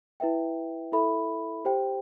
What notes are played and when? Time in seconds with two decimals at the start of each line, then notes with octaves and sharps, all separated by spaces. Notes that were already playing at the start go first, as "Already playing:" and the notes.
0.20 E4 B4 E5 G5
0.92 E4 A4 E5 B5
1.65 G4 C5 G5